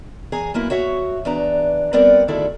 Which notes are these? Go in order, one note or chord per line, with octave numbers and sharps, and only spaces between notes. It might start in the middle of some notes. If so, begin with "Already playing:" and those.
E2 G#4 G#5 A#5
F#2 A#3 B3 E4
F#4 C#5 E5 F#5
E2 D4 B4 A#5
G3 B3 C4 A#4 D5 F#5
D2 D#3 E4 G#4 A4 D5